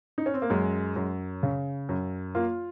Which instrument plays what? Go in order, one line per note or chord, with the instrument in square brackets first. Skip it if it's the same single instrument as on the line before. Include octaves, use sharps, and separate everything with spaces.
[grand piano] D#4
C#4
C4
A#3
[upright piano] F#2 [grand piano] G#3
[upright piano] F#2
C#3
F#2
[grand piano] A#3 [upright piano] F4